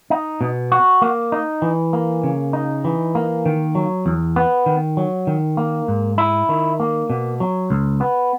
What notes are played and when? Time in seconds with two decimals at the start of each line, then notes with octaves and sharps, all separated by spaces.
0.10 D#4
0.41 B2
0.72 F#4
1.02 A#3
1.32 D#4
1.62 E3
1.93 A#3
2.23 C#3
2.53 D#4
2.85 E3
3.15 A#3
3.46 D#3
3.75 F#3
4.06 E2
4.36 B3
4.66 D#3
4.97 F#3
5.27 D#3
5.57 A#3
5.88 G#2
6.18 E4
6.49 D#3
6.80 A#3
7.10 B2
7.40 F#3
7.70 C#2
8.01 B3